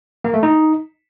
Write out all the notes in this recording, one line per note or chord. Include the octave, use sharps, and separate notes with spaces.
A#3
A3
D#4